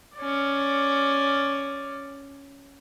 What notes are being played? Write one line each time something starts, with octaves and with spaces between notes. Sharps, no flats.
C#4 D5